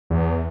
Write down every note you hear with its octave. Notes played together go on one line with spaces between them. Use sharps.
E2